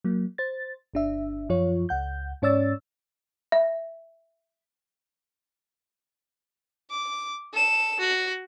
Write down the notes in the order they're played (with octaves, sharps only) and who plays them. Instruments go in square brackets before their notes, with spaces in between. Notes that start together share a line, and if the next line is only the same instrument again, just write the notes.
[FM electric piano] F#3 A#3
C5 A6
G1 D4 E5
F#2 F3 F4 C#5
C#2 F#5 G6
G#2 C#4 C#5 D5 E6 A6
[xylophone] E5
[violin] D6
A4 E7
F#4